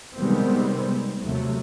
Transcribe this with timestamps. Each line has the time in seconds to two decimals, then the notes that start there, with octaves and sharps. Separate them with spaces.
0.17 C3 D#3 G3 G#3 B3 C4
1.21 D#2 C3 F#3 A3